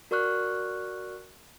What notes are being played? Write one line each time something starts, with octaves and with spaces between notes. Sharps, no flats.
F#4 A#4 D5 C#6 F6 F#6